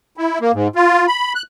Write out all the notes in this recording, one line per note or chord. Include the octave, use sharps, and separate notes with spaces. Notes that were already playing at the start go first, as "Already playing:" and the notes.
E4
A#3
G#2
F4
B5
F#6